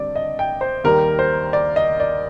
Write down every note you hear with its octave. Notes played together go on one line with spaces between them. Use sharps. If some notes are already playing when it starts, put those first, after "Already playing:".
Already playing: G2 D3 G3 C4 D5
D#5
G5
C5
D#2 D#3 G3 A#4
C5
D5
D#5
D5